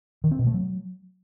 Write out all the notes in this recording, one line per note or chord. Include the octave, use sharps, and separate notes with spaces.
D#3
C4
B2
A3
F#3